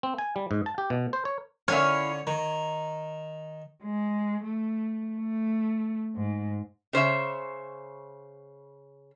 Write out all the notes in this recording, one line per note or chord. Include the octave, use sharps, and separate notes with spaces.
C4
G#5
G3
G#2
A5
G4
B2
C5
C#5
D3 C#4 E4 C#5 F5 F6
D#3 A#5
G#3
A3
A3
G#2
C#3 C5 C#5 E5